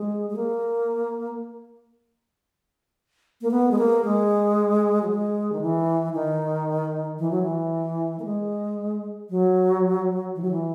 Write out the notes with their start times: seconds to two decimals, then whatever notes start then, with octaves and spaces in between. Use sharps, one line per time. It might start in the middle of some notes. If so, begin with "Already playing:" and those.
Already playing: G#3
0.30 G#3
0.36 A#3
3.42 A#3
3.51 B3
3.71 G#3
3.78 A#3
4.05 G#3
5.02 F#3
5.09 G#3
5.52 D#3
5.61 E3
6.14 D#3
7.19 E3
7.31 F#3
7.42 E3
8.19 A#3
8.25 G#3
9.30 F#3
10.35 E3
10.42 F#3
10.51 E3